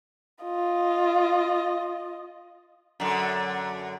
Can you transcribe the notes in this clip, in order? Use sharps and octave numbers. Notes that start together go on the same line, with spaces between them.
F4 D#5
F#2 D3